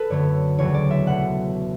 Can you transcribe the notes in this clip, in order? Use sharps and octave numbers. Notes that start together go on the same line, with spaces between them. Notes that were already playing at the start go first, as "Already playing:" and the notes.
Already playing: A4 B4
F#2 D3 A3 C#5
E1 D2 C#3 F#3 C#5
D5
E5
B2 A3 F#5